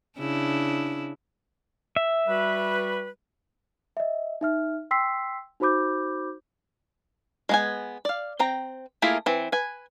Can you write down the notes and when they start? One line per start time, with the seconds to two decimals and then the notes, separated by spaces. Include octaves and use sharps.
0.18 C#3 D4 E4
1.96 E5
2.27 G3 F#4 B4
3.97 D#5 E5
4.41 D#4 E5 F6
4.91 G5 C6 E6 B6 C7
5.60 D#4 F#4 C5 B5 D6 G6
7.49 G#3 B3 G#5
8.05 D5 F5
8.39 C4 G5 A#5
9.02 A3 A#3 E4 F4 G#4
9.26 E3 C4
9.52 B4 G#5